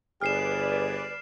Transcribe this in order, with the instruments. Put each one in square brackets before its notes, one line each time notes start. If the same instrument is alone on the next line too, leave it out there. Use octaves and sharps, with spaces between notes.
[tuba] G1 [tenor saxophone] G#4 [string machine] B4 D5 [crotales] F6 C7 E7